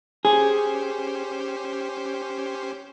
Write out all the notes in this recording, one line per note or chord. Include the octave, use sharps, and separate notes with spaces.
C#4 G4 G#4 C5